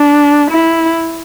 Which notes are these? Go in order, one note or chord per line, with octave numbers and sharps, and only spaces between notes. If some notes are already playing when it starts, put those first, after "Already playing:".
Already playing: D4
E4